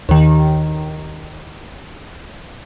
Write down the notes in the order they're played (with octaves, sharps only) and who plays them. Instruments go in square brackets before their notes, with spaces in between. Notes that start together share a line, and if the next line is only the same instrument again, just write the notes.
[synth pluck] D#2 D#3